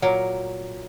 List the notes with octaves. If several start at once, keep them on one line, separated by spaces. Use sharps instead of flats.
A#2 F#3 A#4